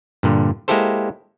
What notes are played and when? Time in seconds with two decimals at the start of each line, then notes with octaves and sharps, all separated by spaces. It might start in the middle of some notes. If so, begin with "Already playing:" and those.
0.23 G2 A#2 D3
0.68 G#3 A#3 E4 G4 A4 C5